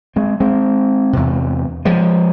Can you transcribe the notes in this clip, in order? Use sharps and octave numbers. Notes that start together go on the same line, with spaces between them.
G#3 C4
G#3 C4
E2 C3
F3 G#3